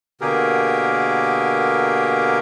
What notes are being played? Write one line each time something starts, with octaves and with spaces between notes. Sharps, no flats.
B2 D3 A#3 G4 G#4 A#4